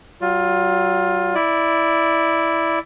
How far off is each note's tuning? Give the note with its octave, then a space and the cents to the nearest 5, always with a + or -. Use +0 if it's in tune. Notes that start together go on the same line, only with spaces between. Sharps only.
F#3 +45 F4 +20
E4 +0 D5 +0